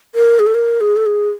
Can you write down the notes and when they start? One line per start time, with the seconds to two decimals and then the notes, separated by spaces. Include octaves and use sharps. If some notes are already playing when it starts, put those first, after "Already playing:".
0.15 A#4
0.39 G#4
0.47 A4
0.55 A#4
0.81 G#4
0.97 A4
1.06 G#4